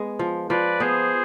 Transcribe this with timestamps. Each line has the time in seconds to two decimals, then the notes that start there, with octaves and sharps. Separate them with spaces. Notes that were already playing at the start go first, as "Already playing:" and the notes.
Already playing: G#3 B3
0.19 F3
0.50 F3 B4 D5
0.80 B3 G#4 C5